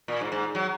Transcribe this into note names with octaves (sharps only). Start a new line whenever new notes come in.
A#2
G#2
G#2
F#3